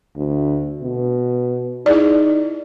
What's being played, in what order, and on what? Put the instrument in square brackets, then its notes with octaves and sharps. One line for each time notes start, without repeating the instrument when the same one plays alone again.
[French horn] D2
B2
[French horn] D#4 [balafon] E4 G#4 D5